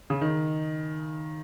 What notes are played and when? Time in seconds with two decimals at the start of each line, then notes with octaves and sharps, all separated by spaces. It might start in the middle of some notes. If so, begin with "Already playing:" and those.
0.10 C#3
0.21 D#3